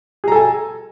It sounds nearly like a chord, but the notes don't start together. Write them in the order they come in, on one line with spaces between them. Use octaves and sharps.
G#4 A#5 A4 G#5